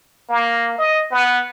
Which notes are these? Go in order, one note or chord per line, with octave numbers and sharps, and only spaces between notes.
A#3
D#5
B3